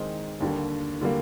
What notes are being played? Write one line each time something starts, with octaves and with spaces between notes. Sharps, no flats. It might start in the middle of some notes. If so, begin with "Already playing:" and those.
Already playing: D#3 G#3 C4 D#4
D#2 D3 G3 A#3
D3 G3 A#3